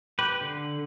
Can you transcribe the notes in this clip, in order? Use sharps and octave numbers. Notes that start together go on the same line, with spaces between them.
G4 B4
D3